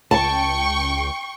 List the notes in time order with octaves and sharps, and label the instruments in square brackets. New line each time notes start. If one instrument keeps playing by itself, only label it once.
[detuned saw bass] C#2 [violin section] G5 C#6 [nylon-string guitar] A5